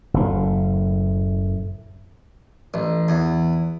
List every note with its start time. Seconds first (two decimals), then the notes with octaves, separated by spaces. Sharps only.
0.14 F#1 A2
2.74 A1
3.09 E2